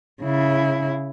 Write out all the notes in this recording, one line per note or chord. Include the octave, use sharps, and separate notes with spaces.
C#3 E4